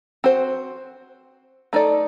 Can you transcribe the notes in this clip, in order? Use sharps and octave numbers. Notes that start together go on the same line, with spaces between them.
C4 F#4 C5
A3 D#4 A4 D5